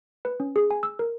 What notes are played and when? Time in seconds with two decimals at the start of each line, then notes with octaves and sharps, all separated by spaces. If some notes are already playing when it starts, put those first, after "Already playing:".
0.25 B4
0.40 C#4
0.56 G#4
0.71 G#5
0.83 E6
0.99 A#4